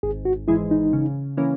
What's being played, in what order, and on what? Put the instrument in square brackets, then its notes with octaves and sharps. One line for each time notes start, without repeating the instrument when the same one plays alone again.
[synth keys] G#1 [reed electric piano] G#4
[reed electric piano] F#4
[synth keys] G#2 E3 G#3 [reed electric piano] E4
[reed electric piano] D#4
[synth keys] C#3
E3 A#3 C#4